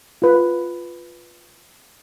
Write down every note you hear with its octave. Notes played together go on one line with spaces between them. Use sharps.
F4 B4